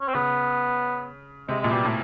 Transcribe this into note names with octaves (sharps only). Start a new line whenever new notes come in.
C#4
C4
C#3 B3
C3 G#3
A#2 G#3
B2 G3
A2